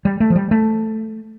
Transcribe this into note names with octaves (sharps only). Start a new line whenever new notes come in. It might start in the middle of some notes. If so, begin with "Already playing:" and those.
G3
A3
F3
G3
A3